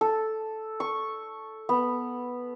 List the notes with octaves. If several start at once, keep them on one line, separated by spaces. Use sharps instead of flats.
A4
C#6
B3